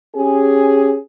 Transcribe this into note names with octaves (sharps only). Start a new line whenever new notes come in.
C#4 G4 G#4